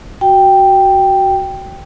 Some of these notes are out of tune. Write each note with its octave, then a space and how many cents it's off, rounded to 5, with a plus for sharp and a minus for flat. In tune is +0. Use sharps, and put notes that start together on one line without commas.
F#4 +10 G5 +0